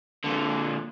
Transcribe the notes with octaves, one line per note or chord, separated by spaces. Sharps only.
A#2 D3